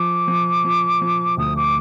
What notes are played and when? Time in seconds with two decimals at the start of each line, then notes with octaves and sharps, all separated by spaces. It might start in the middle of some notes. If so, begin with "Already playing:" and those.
Already playing: F3 D6
0.28 F3
0.64 F3
1.01 F3
1.37 D2 D#6
1.56 D6